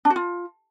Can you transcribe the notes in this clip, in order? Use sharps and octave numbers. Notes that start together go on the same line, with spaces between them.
D4
F#4
F4